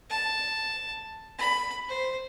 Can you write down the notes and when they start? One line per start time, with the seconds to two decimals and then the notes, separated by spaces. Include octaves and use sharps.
0.10 A5
1.39 B5
1.89 C5